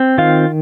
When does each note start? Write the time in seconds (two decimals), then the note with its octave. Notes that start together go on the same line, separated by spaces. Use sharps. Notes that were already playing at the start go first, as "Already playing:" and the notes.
Already playing: C4
0.18 D#3 F4 F5